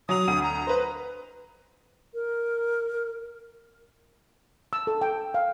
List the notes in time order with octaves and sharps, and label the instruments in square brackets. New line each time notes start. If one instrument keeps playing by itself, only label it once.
[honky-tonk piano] F#3 F7 [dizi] D#6
[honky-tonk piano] D2 D#7
[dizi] A#5
[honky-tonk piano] B4 C5
[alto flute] A#4
[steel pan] E6
A4
G5
F5